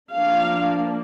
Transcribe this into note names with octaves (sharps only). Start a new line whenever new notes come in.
F3 A#3 D4 F5